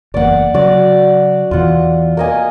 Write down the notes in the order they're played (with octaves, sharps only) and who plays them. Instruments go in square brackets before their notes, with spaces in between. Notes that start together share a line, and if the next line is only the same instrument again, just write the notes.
[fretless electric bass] F#1 E2 A#3 [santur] D5 F#5
[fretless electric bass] C#3 F#3 [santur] F#4 D5
[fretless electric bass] E2 B2 E3 [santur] F4 F#5
[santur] A#3 D#5 G#5